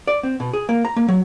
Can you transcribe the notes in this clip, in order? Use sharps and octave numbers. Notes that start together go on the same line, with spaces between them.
D5
C4
B2
G#4
A#3
A#5
A#3
F#3